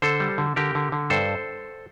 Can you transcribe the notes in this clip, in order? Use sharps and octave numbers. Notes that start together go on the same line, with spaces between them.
D3 A4 C5
G3
D3
D3 G4 A#4
D3
D3
G2 A4 C5